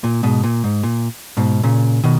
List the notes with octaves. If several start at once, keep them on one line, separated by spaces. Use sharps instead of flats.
A#2
G#2 B2
A#2
G#2
A#2
G#2 B2
A#2 C#3
B2 D#3